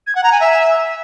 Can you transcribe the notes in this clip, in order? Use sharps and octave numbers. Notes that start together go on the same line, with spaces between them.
G#6
F#5
A#5
G#5
E5